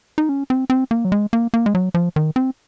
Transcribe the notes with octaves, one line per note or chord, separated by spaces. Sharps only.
D#4
C#4
C4
C4
A#3
F#3
G#3
A#3
A#3
G#3
F#3
F3
D#3
C4